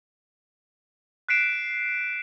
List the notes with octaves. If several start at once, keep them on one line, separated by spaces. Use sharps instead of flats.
F#6 B6 C7 D7 E7